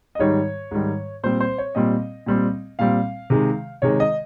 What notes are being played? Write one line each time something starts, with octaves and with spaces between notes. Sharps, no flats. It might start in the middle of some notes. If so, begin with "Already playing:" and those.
D#5
G#2 D#3 G3 C#5
G#2 D#3 G3
A#2 G3 C4 C5
C5
C#5
A#2 G3 C4 D#5
A#2 G3 C4
A#2 G3 C4 F5
C3 D#3 G#3
C3 D#3 G#3 C#5
D#5